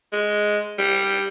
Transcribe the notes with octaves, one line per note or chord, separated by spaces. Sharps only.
G#3
G3